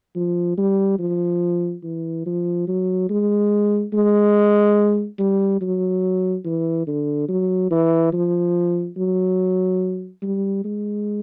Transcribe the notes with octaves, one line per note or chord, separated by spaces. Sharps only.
F3
G3
F3
E3
F3
F#3
G#3
G#3
G3
F#3
E3
D3
F#3
E3
F3
F#3
G3
G#3